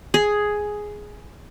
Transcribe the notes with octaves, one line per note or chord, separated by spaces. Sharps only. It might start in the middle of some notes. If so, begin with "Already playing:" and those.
G#4